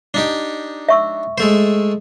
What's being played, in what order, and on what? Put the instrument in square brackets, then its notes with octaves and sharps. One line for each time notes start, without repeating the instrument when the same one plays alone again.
[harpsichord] D4 D#4 G4
[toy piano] E5 C#6 E6
[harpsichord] G#3 A3 C5